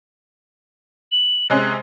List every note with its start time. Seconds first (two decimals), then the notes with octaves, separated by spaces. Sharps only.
1.12 F#7
1.50 C3 G#3 C#4 F#6